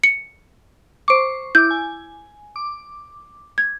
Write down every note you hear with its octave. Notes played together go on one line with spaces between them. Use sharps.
C#7
C5 C#6 D6 D7
E4 D6 G6
G#5
D6
G#6